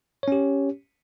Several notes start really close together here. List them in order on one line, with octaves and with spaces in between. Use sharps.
C#5 C#4 G4